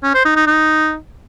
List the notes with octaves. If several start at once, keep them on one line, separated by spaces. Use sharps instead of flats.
C#4
C5
D#4
D#4
D#4